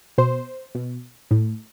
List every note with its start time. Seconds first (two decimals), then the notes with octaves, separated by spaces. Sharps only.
0.18 B2 C5
0.75 B2
1.31 A2